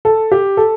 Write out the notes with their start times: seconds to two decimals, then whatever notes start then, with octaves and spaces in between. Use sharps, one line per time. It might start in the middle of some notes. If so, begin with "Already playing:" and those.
0.05 A4
0.32 G4
0.57 A4